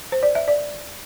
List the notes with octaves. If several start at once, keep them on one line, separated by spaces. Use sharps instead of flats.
C5
D5
E5
D5